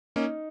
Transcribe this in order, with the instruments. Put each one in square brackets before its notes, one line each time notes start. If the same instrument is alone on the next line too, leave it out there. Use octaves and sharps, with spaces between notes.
[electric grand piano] A#3 C#4 [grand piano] D#4